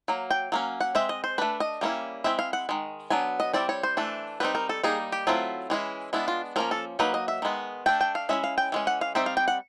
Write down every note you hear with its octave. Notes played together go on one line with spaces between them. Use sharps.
F#3 A#3
G5
F#3 A#3 C#4
F#5
G#3 C4 E5
D#5
C5
A3 D4 B4
D#5
G3 A#3 C#4 E4
G#3 C4 E4 E5
F5
F#5
D#3 G#3
F#3 B3 D4 G#5
D#5
G3 C4 E4 D5
C#5
C5
E3 A3 D4
G3 C4 D#4 B4
A#4
A4
G3 A#3 D#4 G#4
G4
F#3 A3 C4 E4 F4
E3 G#3 C#4 E4
G#3 B3 D4 E4
F4
F3 A#3 C#4 A#4
A4
F#3 A#3 D#4 B4
D#5
E5
D#3 G#3 B3
A3 D4 G5
G5
F5
G#3 C#4 E4 E5
F5
G5
E3 G#3 C#4
F#5
F5
G3 C4 D#4 E5
F5
G5
F#5